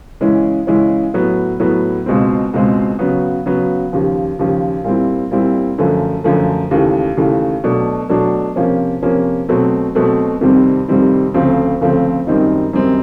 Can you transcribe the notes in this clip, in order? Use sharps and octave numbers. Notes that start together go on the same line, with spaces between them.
C#3 E3 G#3 C#4 E4
C#3 E3 G#3 C#4 E4
A2 F#3 B3
A2 F#3 B3
C#2 B2 G#3 C4
C#2 B2 G#3 C4
C#3 F#3 B3
C#3 F#3 B3
D#2 C#3 F3
D#2 C#3 F3
A#2 G3 C4 E4
A#2 G3 C4 E4
F#2 D3 F3 A3
F#2 D3 F3 A3
D#2 C#3 E3 A3
D#2 C#3 E3 A3
B2 F#3 A3 D4
B2 F#3 A3 D4
C3 F3 A#3 C#4
C3 F3 A#3 C#4
B2 F#3 A3 C4
B2 F#3 A3 C4
F2 C3 D#3 G3 C4
F2 C3 D#3 G3 C4
D2 C#3 F3 A3 C4
D2 C#3 F3 A3 C4
F#2 D#3 G3 C4 D#4
F#2 D#3 G3 C4 D#4